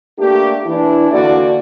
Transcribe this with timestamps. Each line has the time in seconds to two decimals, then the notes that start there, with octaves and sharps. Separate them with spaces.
0.18 A3 A#3 D4 G4
0.65 E3 D4 E4
1.10 E2 D3 A#3 D4 F#4 D5